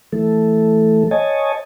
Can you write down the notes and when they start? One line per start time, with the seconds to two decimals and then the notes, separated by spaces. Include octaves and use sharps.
0.12 E3 A3 A4
1.11 C#5 D#5 G#5 A5